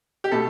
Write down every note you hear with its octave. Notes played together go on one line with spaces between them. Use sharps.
G4
B2 A3 A4